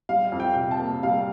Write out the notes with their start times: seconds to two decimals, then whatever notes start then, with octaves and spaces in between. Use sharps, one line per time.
0.09 G3 F5
0.32 F2
0.40 G5
0.55 C3
0.71 A5
0.79 A#3
1.03 G3 F5